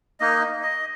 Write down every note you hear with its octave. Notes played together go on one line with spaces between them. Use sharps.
A#3 D#4 D#5
D#5